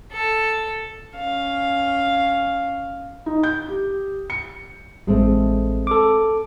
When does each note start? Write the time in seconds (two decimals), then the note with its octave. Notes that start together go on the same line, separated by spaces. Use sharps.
0.13 A4
1.16 C#4 F5
3.26 D#4
3.43 G6
3.68 G4
4.30 C#7
5.07 A1 G#3 A3 C4
5.87 A4 D6